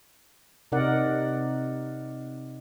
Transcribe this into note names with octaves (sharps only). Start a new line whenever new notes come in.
C3 D#4 A#4 D5 F#5